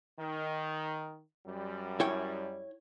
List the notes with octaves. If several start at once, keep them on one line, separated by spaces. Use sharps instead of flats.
D#3
F#2 G3
E4 C#5 G5